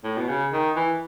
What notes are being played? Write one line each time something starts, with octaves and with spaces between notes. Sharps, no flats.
A2
B2
C#3
D#3
E3